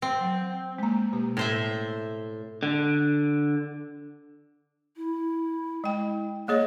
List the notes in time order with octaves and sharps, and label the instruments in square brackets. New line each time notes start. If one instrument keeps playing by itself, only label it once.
[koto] C4
[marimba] F#3
G#3 A#3
B2 A#3 G4
[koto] A2 C5 E5
[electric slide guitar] D3
[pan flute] E4
[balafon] G#3 G5
[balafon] A#3 G#4 C#5 [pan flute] D#5